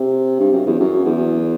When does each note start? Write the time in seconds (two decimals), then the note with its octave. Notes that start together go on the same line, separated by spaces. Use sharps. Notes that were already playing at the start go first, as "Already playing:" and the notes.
Already playing: C3
0.40 G2
0.52 F#2
0.67 E2
0.80 F#2
1.05 E2